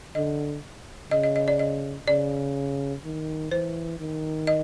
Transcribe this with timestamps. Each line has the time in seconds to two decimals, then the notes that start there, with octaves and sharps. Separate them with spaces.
0.15 D3 D#5
1.11 C#3 D#5
1.23 D#5
1.36 D#5
1.48 D5
1.59 D#5
2.08 C#3 D5
3.04 D#3
3.51 E3 C5
4.00 D#3
4.47 D#5